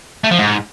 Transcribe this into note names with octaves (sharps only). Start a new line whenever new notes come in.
A3
F3
G#2